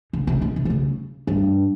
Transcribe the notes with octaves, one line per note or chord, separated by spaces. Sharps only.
C#3
C3
B2
C3
D3
C#3
G2